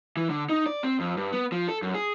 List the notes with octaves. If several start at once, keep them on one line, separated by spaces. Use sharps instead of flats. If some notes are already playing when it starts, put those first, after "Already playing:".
E3
D3
D#4
D5
C4
F2
G2
B3
F3
A4
F#2
G#4